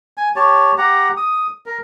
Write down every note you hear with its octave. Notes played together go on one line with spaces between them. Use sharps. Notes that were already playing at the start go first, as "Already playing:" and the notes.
G#5
G4 C#5 A5
G4 F#5 A#5
D#6
A#4